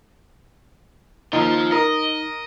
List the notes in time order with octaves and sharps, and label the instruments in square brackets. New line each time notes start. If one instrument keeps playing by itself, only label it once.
[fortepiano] D#2 [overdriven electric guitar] F3 [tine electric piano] D#4
[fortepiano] A#4 [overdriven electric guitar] D#5